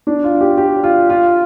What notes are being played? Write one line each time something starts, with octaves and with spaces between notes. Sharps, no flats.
D4
F4
G4
G4
F4
F4